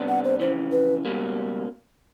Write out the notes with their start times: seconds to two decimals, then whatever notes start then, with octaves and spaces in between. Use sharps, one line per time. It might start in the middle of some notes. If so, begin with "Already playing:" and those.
Already playing: C3 G3 B3 D4
0.09 F#5
0.24 C5
0.40 F2 C#3 E3 C5
0.72 B4
1.05 C#2 B2 G3 A#3